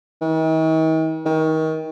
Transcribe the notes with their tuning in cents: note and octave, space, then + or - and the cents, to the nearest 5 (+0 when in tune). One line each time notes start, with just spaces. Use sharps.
D#3 +45
D#3 +30